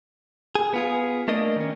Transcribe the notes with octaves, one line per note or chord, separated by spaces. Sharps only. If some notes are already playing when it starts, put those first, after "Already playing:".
G#4
B3 F4 G#4
A3 A#3 D4 A#4 D#5
D#3 C#4